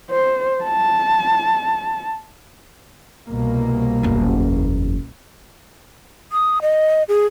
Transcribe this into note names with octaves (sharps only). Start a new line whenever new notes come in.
C5
A5
C2 B2 A#3
F#1 E2
D#6
D#5
G#4